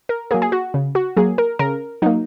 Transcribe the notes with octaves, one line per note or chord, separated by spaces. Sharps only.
A#4
F#3 A#3 G#4
G#4
F#4
C#3
F#4
F#3 A#3 G#4
A#4
C#3 A#4
F#3 A#3 D#4